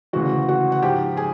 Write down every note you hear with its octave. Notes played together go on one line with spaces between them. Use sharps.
D2 C#3 E3 F#4 F#5
F#4 F#5
F#5
G#2 F3 G4 G5
G#4 G#5